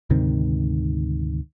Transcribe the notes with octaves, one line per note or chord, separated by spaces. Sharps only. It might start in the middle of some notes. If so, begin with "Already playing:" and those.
D2 G#2 C3 D#3